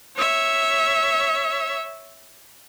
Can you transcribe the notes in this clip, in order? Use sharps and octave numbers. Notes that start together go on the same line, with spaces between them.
C#5 E5